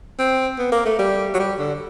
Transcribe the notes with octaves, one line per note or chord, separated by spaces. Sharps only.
C4
B3
A#3
A3
G3
F#3
G3
D3